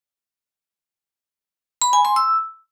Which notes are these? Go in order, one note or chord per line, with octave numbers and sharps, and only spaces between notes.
B5
G#5
C6
E6